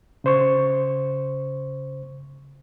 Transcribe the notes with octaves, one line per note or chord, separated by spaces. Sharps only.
C#3 C5 C#6